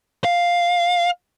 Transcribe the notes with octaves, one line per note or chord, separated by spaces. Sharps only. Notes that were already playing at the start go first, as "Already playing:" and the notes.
F5